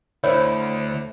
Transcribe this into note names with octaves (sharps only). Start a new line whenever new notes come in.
D2 E4 C5 C#5